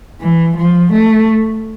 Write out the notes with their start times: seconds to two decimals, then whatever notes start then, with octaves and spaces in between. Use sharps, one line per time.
0.21 E3
0.57 F3
0.93 A3